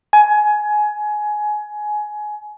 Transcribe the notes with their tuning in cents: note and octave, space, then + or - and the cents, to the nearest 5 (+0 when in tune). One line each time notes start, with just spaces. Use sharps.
G#5 +20